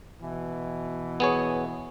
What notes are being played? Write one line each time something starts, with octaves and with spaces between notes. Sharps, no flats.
B2 E3
B3 G#4 C#5